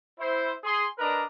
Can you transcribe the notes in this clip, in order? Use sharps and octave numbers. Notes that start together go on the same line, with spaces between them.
E4 C5
G#4 C6
D4 A#4 B4 D5 D#5 A#5